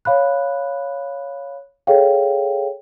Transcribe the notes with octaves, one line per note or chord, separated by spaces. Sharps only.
C#5 F5 B5 F#6
G#4 A4 C#5 F5 G5